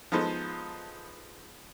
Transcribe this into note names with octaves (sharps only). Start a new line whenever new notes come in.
F3 G#3 B3 D#4 A4 C5